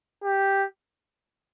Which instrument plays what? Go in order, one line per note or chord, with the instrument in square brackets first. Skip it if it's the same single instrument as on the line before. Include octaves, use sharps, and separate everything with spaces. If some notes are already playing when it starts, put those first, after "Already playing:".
[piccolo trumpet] G4